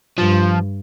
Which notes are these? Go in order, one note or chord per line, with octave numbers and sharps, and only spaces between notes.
G2 F3